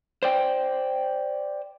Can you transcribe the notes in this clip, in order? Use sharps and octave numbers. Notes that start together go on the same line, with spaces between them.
C5 D5 G5